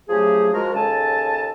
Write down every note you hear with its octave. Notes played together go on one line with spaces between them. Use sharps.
C#3 F3 F#3 A3 G4 G#4
F3 G#3 F#4 A#4
D#2 C#3 A4 G#5 A5